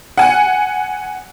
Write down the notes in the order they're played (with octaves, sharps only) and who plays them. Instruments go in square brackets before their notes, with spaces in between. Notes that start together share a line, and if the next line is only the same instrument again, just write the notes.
[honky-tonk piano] F#5 G#5